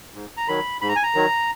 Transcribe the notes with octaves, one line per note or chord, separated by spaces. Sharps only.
G#2
A#5
D#3 F#3 B5
G#2 B5
A#5
G#5
A#5
D#3 F#3